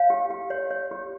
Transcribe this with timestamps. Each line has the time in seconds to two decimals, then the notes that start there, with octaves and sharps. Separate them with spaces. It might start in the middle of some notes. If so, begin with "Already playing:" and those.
Already playing: C#5 F5 G#5
0.10 G4
0.30 G4
0.50 C#5
0.71 C#5
0.91 G4